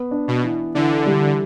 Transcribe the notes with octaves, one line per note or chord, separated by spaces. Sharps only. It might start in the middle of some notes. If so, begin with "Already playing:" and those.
Already playing: B3
D4
B2
E3
D3 E3
G3